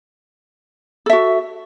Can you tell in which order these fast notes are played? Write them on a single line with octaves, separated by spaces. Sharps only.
A4 E5 F#4